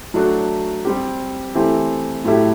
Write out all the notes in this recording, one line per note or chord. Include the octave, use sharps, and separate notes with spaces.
F#3 A3 D4 F#4
G3 C4 G4
E3 A3 C4 G4
A2 F#3 A3 E4 G4